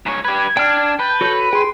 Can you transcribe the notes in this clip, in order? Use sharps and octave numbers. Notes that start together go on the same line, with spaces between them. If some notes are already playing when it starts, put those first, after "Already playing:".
G#2 C#5
G4 B4 G#6
D4 G5 F6
B4 A5 G6
F#4 A4 C#5
G#4 G5 C6